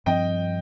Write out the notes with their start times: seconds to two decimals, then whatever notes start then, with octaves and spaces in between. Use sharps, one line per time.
0.06 G2 F3 C4 D#5 G5